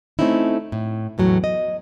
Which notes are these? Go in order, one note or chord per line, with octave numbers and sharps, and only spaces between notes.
A3 A#3 C4 C#4 D#4 E4
A2
E2 A2 F#3 A3
D#5